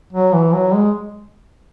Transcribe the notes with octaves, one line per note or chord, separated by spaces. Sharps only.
F#3
E3
F#3
G#3